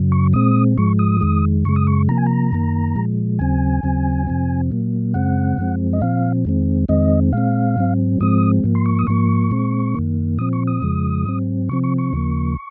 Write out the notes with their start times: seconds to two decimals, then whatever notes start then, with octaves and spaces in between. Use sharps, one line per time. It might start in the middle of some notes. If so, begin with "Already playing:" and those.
Already playing: F#2 C#3 F#3
0.12 C#6
0.33 A#2 G#3 C4 D#6
0.78 G#2 F3 G#3 C#6
0.99 D#6
1.21 F2 D#3 G#3
1.65 F#2 C#3 G#3 C#6
1.76 D#6
1.87 C#6
2.09 C3 F3 A#3 A#5
2.17 G#5
2.26 A#5
2.52 F#2 D#3 A#3
2.96 A#2 F3 G#3
3.39 D#2 C#3 F#3 C4 G#5
3.83 D#2 C#3 F#3 C4
4.27 F2 C3 F3 C4
4.71 A#2 F#3 A#3
5.14 F#2 C#3 G#3 C4 F#5
5.58 F#2 F3 G#3 C4
5.93 D#5
6.01 A#2 F3 C4 F5
6.45 F2 D#3 G#3 C4
6.88 F2 D#3 G#3 C4 D#5
7.33 A#2 G#3 C4 F5
7.76 G#2 F#3 C4
8.20 G#2 F3 G#3 C4 D#6
8.64 G#2 F3 A#3
8.75 C6
8.86 C#6
8.99 D#6
9.07 G#2 F3 A#3 C#6
9.51 A#2 G#3 C4
9.95 F#2 D#3 A#3
10.39 A#2 F3 C4 D#6
10.53 C#6
10.67 D#6
10.82 F2 C#3 F3 G#3
11.25 G#2 F#3 C4
11.69 C3 F3 C4 C#6
11.83 C#6
11.98 C#6
12.13 D#2 C#3 F3 A#3